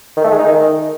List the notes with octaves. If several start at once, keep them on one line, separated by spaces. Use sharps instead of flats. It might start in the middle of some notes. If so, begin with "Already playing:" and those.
D#3
A3
G#3
D#4
D#3